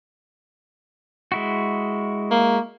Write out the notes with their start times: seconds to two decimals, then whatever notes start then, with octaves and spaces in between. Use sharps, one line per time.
1.32 G#3 E4 F#4
2.31 A#3